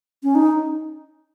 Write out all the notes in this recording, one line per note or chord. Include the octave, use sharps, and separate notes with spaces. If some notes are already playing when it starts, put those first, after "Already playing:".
C#4
D#4